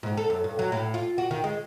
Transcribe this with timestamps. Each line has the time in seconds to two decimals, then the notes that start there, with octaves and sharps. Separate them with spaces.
0.03 G#2
0.17 A4
0.30 F#2
0.44 G2
0.59 F#3
0.72 A2
0.94 F4
1.18 F#4
1.31 D#3
1.44 G#3